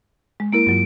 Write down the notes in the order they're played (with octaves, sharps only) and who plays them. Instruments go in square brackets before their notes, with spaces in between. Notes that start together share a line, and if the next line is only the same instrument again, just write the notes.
[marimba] G#3
[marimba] A#3 E4 A#4 [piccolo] D7
[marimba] G2 F#3 F4